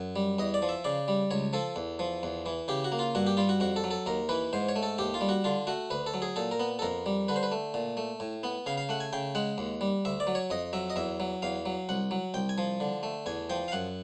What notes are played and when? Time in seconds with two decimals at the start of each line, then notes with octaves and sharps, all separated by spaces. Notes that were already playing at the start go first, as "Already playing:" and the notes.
Already playing: F#2
0.16 G3
0.38 E2 D#5
0.54 D5
0.62 F3
0.69 E5
0.84 C#3 D5
1.08 G3
1.31 C#2 C#5
1.53 F3 A4
1.76 E2
1.99 F3
2.23 E2
2.46 E3
2.68 C#3 G4
2.84 F#4
2.92 A#3
2.99 F4
3.15 G2 F#4
3.27 G4
3.37 G3 F4
3.49 F#4
3.60 F2 F#4
3.76 A4
3.84 F#3
3.91 A4
4.06 D#2 A#4
4.29 E3 B4
4.53 G#2 C5
4.69 C#5
4.76 A3
4.83 A4
4.98 D#2 G4
5.14 F4
5.21 G3
5.29 F#4
5.44 D3 F4
5.67 A3 F#4
5.90 D2 B4
6.06 A4
6.14 F#3
6.22 G#4
6.36 A#2 A4
6.51 A#4
6.59 B3
6.79 A4
6.82 F2 A#4
7.06 G3
7.28 D3 B4
7.36 C5
7.43 B4
7.52 A3
7.74 A#2
7.97 A3
8.20 A2
8.43 B3
8.66 C#3 F5
8.78 F5
8.89 A3 F#5
9.00 G#5
9.13 C#3 G5
9.35 G#3 F#5
9.58 D#2
9.81 G3
10.05 D2 E5
10.20 D5
10.27 F#3
10.35 C#5
10.50 F2 D#5
10.73 F#3 E5
10.90 D#5
10.96 E2 E5
11.20 F#3
11.42 E2 F5
11.66 F#3
11.89 C2 F#5
12.11 F#3
12.34 C2 G5
12.49 G#5
12.58 F3
12.80 D3
13.03 A3
13.26 E2 G#5
13.50 F3 G5
13.68 F5
13.72 F#2 F#5